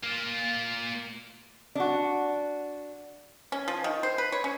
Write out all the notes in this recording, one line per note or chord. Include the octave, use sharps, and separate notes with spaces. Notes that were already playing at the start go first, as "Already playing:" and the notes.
A#3 F4
D4 F#4
C#4
F3
D#3
C5
B4
C#5
C#4